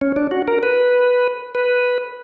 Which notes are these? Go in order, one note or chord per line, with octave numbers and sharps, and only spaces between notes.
C#4
D4
F#4
A#4
B4
B4